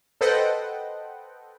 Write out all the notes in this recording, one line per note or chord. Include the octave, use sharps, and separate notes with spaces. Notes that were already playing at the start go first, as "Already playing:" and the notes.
A4 B4 C5 D#5 F#5 G5